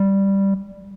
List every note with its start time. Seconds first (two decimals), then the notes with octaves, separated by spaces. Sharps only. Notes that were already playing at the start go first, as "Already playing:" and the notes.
Already playing: G3